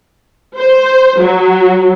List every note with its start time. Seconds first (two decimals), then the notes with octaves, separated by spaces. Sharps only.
0.57 C5
1.19 F#3